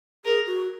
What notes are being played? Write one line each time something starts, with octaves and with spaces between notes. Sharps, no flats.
G#4 A#4
F#4